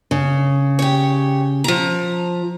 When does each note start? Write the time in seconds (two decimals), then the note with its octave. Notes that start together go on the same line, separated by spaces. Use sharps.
0.11 C#3
0.79 G4 C#5
1.64 F3 A#5